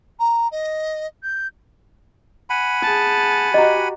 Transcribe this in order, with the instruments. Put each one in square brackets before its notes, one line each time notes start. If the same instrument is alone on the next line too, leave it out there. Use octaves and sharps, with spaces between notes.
[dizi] A#5
D#5
G6
[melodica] F#5 G#5 B5
[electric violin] G#4 A5
[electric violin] F#4 G4 [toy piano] D#5 A#5